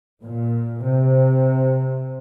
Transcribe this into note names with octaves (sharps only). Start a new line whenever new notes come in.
A#2
C3